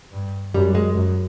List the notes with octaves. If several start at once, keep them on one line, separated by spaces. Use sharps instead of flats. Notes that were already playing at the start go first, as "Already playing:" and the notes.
G2
F#2 G3
G#3
F#2